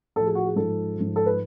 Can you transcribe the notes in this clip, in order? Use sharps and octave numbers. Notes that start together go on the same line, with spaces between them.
A2 F3 A4
G#4
F#4
G#4
G#2 F3 A4
G#2 F3
A4
B4